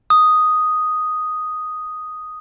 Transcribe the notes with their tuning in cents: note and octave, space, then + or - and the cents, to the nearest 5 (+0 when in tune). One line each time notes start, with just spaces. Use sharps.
D#6 +0